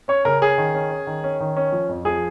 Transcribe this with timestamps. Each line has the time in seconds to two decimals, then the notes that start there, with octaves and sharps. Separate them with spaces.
0.08 C#4 C#5
0.25 C#3 A#4
0.41 C#4 G#4
0.58 D#3
0.74 C#4
0.91 C#4
1.07 D#3
1.24 C#4
1.40 D#3
1.57 C#4
1.72 F3
1.89 F2
2.05 F3 G#4